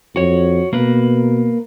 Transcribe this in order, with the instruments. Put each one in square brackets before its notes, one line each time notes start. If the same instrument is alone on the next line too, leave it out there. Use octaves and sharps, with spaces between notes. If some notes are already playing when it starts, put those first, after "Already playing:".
[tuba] F2 [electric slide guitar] F#4 C#5
[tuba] B2 [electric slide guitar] A#3 B4